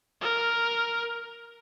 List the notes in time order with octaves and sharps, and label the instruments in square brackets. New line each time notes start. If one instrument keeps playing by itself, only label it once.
[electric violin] A#4